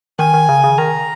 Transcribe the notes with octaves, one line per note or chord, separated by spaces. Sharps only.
D#3 G#5
D#3
C#3
C#3
D#3 A#5